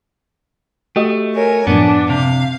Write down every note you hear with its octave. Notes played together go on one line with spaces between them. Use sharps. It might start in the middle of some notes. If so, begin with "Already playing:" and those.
A3 F#4 G4 D#5
A#4 C#5 G#5
F#2 A2 F3 B3 D4
C3 F5